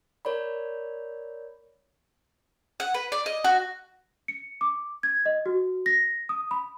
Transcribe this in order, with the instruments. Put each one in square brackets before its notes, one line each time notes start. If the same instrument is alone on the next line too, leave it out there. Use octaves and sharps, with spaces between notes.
[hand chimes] A#4 C#5 D5 B5
[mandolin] F#5
B4
D5
D#5
F#4
[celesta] C#7
D6
G#6
D#5
F#4
A#6
D#6
B5